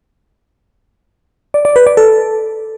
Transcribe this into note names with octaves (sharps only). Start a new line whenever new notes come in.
D5
D5
B4
D5
A4